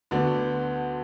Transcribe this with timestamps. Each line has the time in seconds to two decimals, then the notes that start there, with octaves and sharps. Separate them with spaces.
0.11 D2 D3 B3 D4